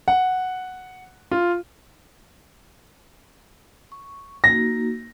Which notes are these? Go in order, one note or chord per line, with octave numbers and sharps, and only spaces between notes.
F#5
F4
C#6
A#3 D#4 F#4 A#6